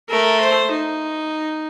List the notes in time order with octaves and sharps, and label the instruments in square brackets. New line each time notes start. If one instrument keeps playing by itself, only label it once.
[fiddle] A3 [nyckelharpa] A#4
[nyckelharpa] C5
D#4